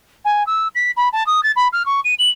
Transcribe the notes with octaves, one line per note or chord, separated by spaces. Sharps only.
G#5
E6
B6
B5
A5
D#6
A6
B5
F6
C#6
D#7
F#7